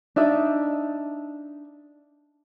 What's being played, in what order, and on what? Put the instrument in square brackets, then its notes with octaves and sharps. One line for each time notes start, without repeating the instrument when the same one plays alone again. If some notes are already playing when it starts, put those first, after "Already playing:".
[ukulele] D4 D#4 E5